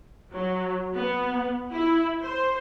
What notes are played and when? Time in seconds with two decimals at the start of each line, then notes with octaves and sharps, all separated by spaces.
0.31 F#3
0.94 B3
1.71 E4
2.24 C5